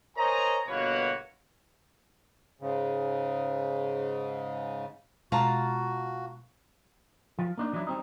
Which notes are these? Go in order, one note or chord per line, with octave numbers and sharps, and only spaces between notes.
A#4 C5 C#5 D#5 G#5 A#5
G1 B2 A#3 F#4 B4 C#5
G#2 C#3
B2 G#3 F4 F#4 A5 A#5
F3
A#3 D4 D#4
E3 F#3 D4 E4
G3 C4 D#4